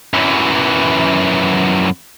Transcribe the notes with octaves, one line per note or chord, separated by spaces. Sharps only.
F#2 E3